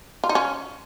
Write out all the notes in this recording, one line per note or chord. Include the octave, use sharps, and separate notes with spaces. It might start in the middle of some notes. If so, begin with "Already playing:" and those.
F4
D#4
C#4